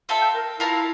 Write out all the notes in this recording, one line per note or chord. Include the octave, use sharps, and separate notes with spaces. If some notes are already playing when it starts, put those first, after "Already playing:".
C4 F4 A4 E5
G5
A#4
E4 F4 A#4 F5 A5